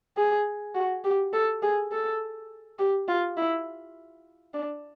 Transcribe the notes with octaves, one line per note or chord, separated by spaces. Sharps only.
G#4
F#4
G4
A4
G#4
A4
G4
F4
E4
D4